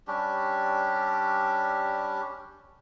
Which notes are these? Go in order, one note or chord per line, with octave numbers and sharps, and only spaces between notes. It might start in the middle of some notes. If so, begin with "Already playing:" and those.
G3 C#4 D4 G4